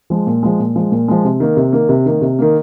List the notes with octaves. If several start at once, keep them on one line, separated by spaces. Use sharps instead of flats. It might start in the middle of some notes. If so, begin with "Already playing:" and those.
F3 G#3
A#2
F3 G#3
A#2
F3 G#3
A#2
F3 G#3
C3
D#3 A#3
C3
D#3 A#3
C3
D#3 A#3
C3
D#3 A#3